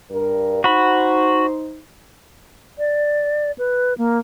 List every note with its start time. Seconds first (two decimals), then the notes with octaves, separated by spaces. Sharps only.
0.11 G2 A#4
0.64 D#4 F#4 C5 B5
2.78 D5
3.58 B4
3.98 A#3